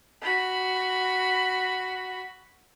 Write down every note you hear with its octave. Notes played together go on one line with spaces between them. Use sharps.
F#4 B5